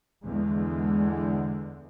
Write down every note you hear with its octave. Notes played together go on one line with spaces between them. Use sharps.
E2 D3 G#3